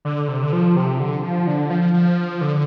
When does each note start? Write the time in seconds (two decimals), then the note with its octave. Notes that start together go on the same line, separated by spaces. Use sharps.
0.05 D3
0.28 C3
0.43 D3
0.52 F3
0.76 C3
1.00 D3
1.23 F3
1.47 D3
1.70 F3
1.94 F3
2.41 D3